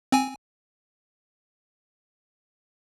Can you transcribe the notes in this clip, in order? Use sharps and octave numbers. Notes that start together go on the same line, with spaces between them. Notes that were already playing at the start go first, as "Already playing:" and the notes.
C4 G#5